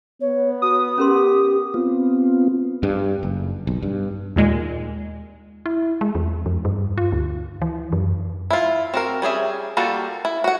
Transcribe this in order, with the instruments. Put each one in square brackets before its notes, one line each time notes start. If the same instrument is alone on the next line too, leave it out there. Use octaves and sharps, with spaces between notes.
[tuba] B3 [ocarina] C#5
[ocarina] F#4 [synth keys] D#6
[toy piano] C#4 A#4 C6 [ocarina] G4
[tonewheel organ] B3 C4 F4
[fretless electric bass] G2
F#1
B1
G2
[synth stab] D#2 A#2 G#3
[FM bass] E4
G#3
E2
F2
G2
F4
D2
E3
F#2
[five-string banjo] E4 F4
C4 F#4 A#4
G3 C#4 G#4 E5
G3 A#3 F4 F#4 A4
E4
F#4 F#5